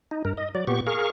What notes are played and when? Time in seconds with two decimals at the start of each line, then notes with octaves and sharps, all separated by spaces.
0.11 D#4
0.25 G2 A#4
0.37 D#5
0.55 F#3 D5
0.67 A#2 B3 G4 C#6
0.87 G#4 A#4 F5 C#6